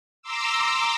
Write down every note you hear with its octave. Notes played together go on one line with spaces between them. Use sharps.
A#5 C6 D6 E6